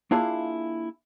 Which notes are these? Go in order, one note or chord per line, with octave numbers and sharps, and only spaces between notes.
A#3 D4 E4 F4 G#4 F5